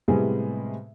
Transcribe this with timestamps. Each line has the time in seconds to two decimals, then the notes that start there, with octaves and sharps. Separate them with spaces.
0.08 A2 C3 G3 G#3 B3 G#4